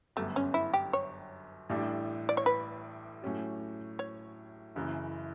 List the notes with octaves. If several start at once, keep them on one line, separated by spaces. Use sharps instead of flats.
G1 F#2 D3 G3 A3 B3
C#4
E4
G4
C#5
A1 A2 G3 D4 G4
D5
C#5
B4
A2 F#3 C#4 G4
C#5
F#1 F#2 C#3 E3